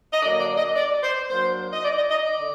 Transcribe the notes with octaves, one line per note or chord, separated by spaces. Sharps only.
D#5
D3 F#3 A#3 D5
D5
D#5
D5
C5
F#3 A#3 D4 C5
D#5
D5
D#5
D#5
D5
D3